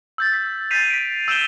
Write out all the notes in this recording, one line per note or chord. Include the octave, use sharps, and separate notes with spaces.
E6 G6 A6
B6
G6 A6 B6 C7 D#7 F7
B6 D7
E6 G6 D7 E7 F7 G7